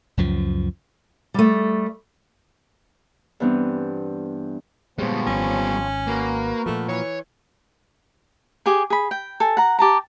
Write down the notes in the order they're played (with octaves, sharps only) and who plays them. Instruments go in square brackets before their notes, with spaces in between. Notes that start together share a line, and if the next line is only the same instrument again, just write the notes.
[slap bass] C#2 F#2 F3
[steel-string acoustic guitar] G3 A3
[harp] G2 E3 B3 C4 D4
[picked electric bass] A#2 G#3 [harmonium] F3 C4 C#5 [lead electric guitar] G3 B3
[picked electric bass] G#1 [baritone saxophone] C#4
[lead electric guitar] A#3 [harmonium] F#4 A#4 B4
[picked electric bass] A#2 F3 [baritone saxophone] A3
[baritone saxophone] E3 [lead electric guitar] C#5
[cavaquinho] G4 G#4 G#5
G#4 B5
G5
A4 G#5
F#5 A#5
G4 A5 A#5